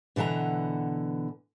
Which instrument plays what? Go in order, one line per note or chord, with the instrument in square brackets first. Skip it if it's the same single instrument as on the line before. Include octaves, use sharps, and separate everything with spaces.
[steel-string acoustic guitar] B2 D3 E3 F#5 A#5